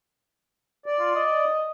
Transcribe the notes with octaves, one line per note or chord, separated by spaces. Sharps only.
D5
F4
D#5